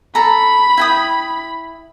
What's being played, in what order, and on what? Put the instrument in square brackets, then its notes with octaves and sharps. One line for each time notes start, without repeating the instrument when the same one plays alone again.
[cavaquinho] A4 A#5 [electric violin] B5
[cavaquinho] E4 G5 D#6